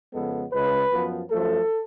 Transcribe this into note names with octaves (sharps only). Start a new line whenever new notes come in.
F2 C#3 G#3 B3 A4
C#2 C#3 G#3 B4
F#2 F3 B3
F#2 F3 A3 A4